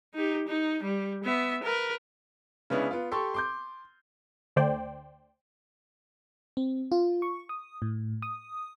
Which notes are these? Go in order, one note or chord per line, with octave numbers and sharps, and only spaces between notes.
D#4 G4
D#4
G3
B3 E5
A#4 B4
C#3 G#3 B3 C#4 D4 E4
B3 F4
G4 A4 C6 C#6
C6 D6 G6
D2 D3 A3 C5 D5 G5
C4
F4
C#6
D#6
A2
D#6